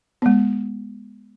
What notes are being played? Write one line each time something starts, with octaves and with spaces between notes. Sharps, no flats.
G#3 B3